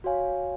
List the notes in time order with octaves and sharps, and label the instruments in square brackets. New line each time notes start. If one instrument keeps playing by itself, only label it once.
[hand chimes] F#4 C#5 F5 G#5